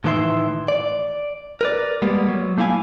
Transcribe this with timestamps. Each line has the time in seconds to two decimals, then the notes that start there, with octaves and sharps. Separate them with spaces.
0.04 A2 D#3 E3 A4 E5 C6
0.68 D5
1.61 A#4 B4 D5
2.02 G3 G#3 A#3 B3
2.28 F#3
2.58 A3 A#3 E4 F5 G#5